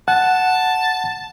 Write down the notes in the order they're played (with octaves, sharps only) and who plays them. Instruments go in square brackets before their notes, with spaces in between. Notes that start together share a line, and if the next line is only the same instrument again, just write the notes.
[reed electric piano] F#5 [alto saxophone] A5